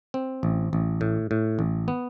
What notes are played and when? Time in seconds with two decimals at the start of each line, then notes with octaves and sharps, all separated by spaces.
0.14 C4
0.43 A1
0.73 A1
1.01 A2
1.31 A2
1.59 A1
1.88 B3